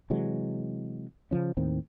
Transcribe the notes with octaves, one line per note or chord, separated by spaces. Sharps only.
C3 E3 F#3 G#3
C#3 E3 F3 C#4
D#2 A2 D#3 C4